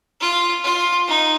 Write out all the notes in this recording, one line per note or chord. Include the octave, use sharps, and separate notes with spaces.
F4
F4
D#4